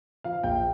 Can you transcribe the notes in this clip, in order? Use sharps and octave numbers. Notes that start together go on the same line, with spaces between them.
F3 F5
A#1 G5